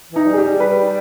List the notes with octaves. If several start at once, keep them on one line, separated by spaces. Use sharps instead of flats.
E3
D#4
G3
G#4
G4
G3
B4